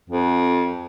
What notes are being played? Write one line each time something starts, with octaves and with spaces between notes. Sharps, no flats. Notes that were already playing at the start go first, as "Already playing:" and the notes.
F2